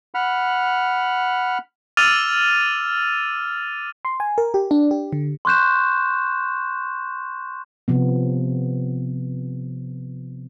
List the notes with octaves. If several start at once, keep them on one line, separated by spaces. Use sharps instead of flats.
F#5 B5 F6
D6 E6 F6 A6 D#7 F7
C6
G#5
A#4
G4
D4
G4
D3
C6 C#6 F#6 G6 E7
C3 F3 B3